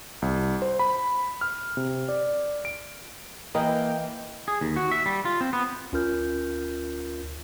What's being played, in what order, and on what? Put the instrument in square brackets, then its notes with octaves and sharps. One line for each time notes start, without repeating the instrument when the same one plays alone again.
[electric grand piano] C2
C5
B5
F6
C3
D5
D7
[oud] E3 B4 D#5 [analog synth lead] A#3 [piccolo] G5
[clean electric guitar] G#4
D#2
F#4
E5
G3
F4
C4
B3
[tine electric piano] D2 C#4 F4 A#4 F6 G6